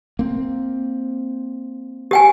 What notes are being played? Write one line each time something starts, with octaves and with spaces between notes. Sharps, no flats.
A#3 C4
G4 G5 G#5